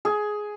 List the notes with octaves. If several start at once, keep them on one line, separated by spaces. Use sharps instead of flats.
G#4